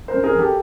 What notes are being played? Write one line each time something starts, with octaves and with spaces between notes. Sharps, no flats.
A#4 C5
F#2
G#4 A#4
F#3 G4 A4